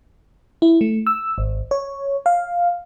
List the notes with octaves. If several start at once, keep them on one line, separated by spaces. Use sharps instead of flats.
E4
A3
E6
G#1
C#5
F5